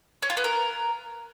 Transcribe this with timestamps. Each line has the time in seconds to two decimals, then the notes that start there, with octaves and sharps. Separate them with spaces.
0.22 C#4
0.30 F4
0.37 B3
0.44 A#4